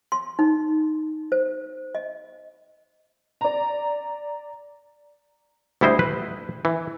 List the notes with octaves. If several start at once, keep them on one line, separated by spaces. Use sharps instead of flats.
C6
D#4
C5
D#5
D5 A#5
D2 G3 E4 C5 D#5
B4
E3